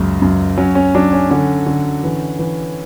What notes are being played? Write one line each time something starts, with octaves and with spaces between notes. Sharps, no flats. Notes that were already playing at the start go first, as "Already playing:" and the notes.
Already playing: C#2 F#2
F#2
F#3 C#4
C#4
F#3 D4
C#4
D3 C#4
D3
E3
E3